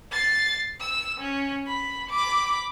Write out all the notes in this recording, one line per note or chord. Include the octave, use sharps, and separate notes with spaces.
A6 C7
E6
C#4
B5
B5 D6